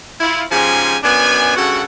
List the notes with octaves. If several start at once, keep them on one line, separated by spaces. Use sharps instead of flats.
E4 F4
G#2 C#3 F3 C#4 G4 G#5
F#2 B3 D4 G#5
G2 C#3 F#4 A4 F#5